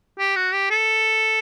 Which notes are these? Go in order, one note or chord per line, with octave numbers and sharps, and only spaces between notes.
G4
F#4
G4
A4